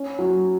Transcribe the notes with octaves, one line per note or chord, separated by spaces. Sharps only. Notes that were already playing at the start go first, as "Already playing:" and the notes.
Already playing: C#4
F#3